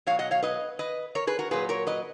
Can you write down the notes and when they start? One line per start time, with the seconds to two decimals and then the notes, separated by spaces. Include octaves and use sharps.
0.07 B2 F#3 C#5 F5
0.19 D#5 F#5
0.31 C#5 F5
0.42 B4 D#5
0.79 B4 D#5
1.15 A#4 C#5
1.27 G#4 B4
1.39 F#4 A#4
1.51 A#2 F#3 G#4 B4
1.69 A#4 C#5
1.87 B4 D#5